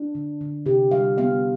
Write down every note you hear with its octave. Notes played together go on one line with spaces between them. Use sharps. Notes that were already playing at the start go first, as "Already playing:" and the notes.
Already playing: D4
D3
D3
C3 G4
G3 F5
B3 F5